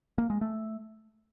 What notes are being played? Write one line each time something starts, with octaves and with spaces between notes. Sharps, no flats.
A#3
G#3
A3